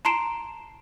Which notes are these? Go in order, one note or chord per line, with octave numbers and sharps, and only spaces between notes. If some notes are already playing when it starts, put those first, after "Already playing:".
A5 A#5 C6 C7 D7 E7